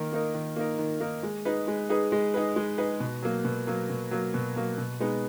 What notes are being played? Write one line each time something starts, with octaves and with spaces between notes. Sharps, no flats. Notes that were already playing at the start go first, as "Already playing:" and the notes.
Already playing: D#3 A#3 D#4 A#4
A#3 D#4 A#4
D#3
A#3 D#4 A#4
D#3
A#3 D#4 A#4
G#3
D#4 G#4 B4
G#3
D#4 G#4 B4
G#3
D#4 G#4 B4
G#3
D#4 G#4 B4
B2
F#3 A#3
B2
F#3 A#3
B2
F#3 A#3
B2
F#3 A#3
B2
G#3 B3 D#4